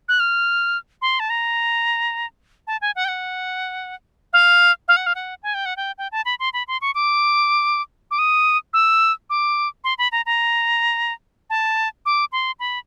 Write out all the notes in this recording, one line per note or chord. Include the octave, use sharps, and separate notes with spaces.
F#6
F6
C6
A5
A#5
A5
G#5
F#5
G5
F#5
F5
F5
F#5
F5
F#5
G#5
G5
F#5
G5
G5
A5
B5
C6
B5
C6
C#6
D6
D6
D#6
E6
D6
C6
B5
A#5
A#5
A5
D6
C6
B5